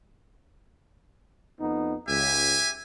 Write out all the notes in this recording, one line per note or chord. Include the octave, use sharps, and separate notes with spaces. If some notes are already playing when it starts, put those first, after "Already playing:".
F2 B3 D#4
C#2 G4 E5 G#5